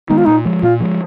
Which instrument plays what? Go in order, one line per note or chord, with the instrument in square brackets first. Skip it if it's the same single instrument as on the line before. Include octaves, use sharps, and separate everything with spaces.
[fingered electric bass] D#3 G#3 B3 [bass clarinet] D#4
[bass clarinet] F4
[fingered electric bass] A#2 [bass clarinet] D#4
[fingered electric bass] F3 G#3
[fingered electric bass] A#2 [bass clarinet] F4
[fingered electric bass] F3 G#3